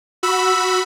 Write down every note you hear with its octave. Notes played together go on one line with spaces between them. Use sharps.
F#4 B5 E6